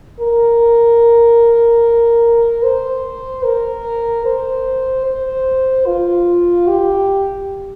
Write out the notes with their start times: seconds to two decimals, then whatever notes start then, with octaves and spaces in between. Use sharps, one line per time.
0.20 A#4
2.63 C5
3.44 A#4
4.25 C5
5.06 C5
5.86 F4
6.68 G4